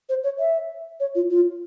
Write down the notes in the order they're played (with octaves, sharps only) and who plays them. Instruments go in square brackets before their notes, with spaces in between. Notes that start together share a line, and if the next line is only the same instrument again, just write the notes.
[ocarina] C5
C#5
E5
C#5
F4
F4